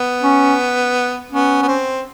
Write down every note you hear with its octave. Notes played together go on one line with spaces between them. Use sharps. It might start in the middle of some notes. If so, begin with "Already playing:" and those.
Already playing: B3
C#4
B3 C#4
B3
C4